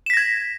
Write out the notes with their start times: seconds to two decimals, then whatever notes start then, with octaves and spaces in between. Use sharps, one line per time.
0.06 E7
0.10 B6
0.13 A#6
0.17 G#6